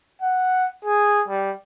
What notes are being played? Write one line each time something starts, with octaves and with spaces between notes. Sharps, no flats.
F#5
G#4
G3